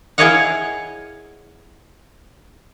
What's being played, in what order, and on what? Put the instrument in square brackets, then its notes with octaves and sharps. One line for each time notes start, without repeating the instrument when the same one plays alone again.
[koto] E4 G#4 C#5 D#5 F5 F#5